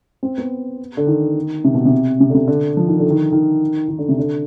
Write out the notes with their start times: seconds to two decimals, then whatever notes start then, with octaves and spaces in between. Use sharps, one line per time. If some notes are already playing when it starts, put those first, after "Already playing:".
0.23 C4
0.38 B3
0.97 D3
1.07 D#3
1.64 C3
1.74 B2
1.85 C3
2.20 C3
2.30 D3
2.34 C3
2.48 D3
2.77 F3
2.88 D#3
2.99 D3
3.10 D#3
3.32 D#3
3.88 D#3
3.99 D3
4.09 C3
4.19 D3